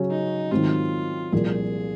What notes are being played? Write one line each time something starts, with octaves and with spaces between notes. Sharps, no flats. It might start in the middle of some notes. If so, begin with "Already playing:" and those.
Already playing: C#3 F#3 C#4 G#4
D#4
G#2 D#3 F#3 C4 F4
C2 A#2 F3 G#4